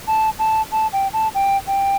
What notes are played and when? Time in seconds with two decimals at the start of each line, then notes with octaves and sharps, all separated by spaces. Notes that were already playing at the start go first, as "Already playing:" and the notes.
0.08 A5
0.39 A5
0.72 A5
0.93 G5
1.13 A5
1.34 G5
1.67 G5